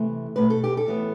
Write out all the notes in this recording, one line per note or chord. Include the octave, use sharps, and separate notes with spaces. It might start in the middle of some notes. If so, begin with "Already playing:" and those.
Already playing: C3 E3 A3
B2 A3 B4
A4
G4
A4
A2 E3 B3